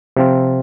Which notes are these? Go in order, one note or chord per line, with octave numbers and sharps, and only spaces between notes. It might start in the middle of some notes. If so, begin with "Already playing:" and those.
C3 F3 C4 F4